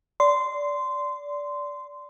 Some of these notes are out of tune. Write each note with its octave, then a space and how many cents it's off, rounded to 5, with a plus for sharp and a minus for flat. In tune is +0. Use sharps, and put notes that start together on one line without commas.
D5 -15 C6 -15